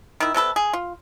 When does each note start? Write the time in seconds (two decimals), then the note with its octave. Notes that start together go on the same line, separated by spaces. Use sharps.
0.20 D#3 E4
0.34 C3 G3 A4 B4
0.56 G#4
0.73 F4